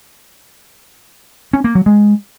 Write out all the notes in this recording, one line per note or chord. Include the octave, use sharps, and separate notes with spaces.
C#4
A#3
F#3
G#3